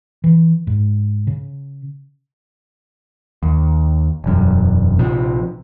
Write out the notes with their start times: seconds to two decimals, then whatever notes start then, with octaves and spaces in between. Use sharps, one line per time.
0.24 E3
0.67 G#2
1.27 C#3
3.43 D#2
4.24 E1 F#2
4.99 A#1 C3 F3